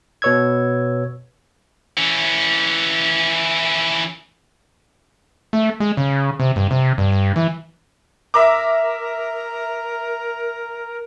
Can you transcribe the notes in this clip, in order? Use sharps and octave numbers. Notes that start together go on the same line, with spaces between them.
B2 B4 C#5 E6 G#6
E3 C#4
A3
G#3
C#3
C3
G2
C3
G2
G2
E3
A#4 E5 A#5 D6